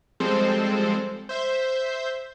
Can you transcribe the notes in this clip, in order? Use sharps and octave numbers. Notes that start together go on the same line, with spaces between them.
F3 G3 G#3 C4 A4 C5
C5 E5 G6